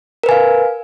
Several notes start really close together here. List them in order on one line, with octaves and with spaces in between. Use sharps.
A#4 B4 G#5 F5